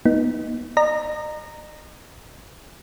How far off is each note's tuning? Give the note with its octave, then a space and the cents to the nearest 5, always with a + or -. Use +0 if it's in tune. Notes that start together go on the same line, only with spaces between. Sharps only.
B3 -30 D#4 +0
D#5 -40 A#5 -10